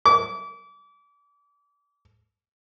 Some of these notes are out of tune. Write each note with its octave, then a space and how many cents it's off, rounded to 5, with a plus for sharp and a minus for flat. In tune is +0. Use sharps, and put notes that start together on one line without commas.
D6 -35